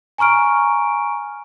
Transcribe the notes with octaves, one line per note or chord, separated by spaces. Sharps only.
G#5 A#5 C#6 F6 D7